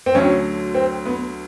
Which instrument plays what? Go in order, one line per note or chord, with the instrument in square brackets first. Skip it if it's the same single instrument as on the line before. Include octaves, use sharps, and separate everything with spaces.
[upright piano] C4
D2 D3 F#3 C#4
C4
B3